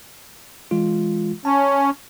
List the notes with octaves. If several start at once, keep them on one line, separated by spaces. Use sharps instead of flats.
E3 G#3 F4
C#4 A5